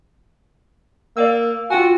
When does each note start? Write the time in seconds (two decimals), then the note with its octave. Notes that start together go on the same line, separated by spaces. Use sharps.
1.17 A#3 D5 F5 E6
1.70 F4 F#4 G5 G#5